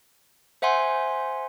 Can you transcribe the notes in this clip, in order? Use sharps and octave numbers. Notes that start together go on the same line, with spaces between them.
C5 E5 F#5 G#5 C6